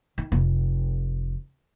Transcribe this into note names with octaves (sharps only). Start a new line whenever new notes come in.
D#3
F1